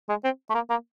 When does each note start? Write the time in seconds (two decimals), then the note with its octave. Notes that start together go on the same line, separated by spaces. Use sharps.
0.09 G#3
0.24 C4
0.50 A3
0.54 A#3
0.70 A#3